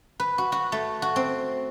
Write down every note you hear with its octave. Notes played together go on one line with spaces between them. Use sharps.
B4
F#4
F#4
A3
F#4
C4